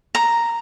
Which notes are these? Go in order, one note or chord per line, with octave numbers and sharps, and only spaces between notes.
A#5